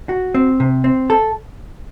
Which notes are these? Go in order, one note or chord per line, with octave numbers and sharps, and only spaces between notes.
F#4
C4
C3
C4
A4